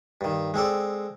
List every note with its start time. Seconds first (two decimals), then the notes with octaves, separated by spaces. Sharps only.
0.21 G2 D#3
0.54 G#3 C4 A4 D5